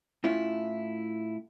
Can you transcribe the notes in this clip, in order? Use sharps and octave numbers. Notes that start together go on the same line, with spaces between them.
A2 C#4 E4 F4